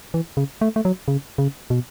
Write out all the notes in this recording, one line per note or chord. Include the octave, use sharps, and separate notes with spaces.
E3
C#3
A3
A3
F#3
C#3
C#3
B2